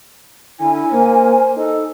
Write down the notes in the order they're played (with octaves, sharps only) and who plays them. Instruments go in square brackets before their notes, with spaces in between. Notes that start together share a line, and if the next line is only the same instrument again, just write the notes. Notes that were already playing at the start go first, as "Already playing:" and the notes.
[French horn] D3 [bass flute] E4 [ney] G#5
[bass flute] A#3 [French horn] C5
[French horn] D#4 [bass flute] A4